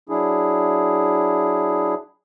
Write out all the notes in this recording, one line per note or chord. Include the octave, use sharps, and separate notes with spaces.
F#3 D4 E4 G#4